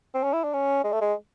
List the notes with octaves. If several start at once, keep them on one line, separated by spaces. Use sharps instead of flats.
C4
C#4
E4
D4
C#4
G#3
A3
G#3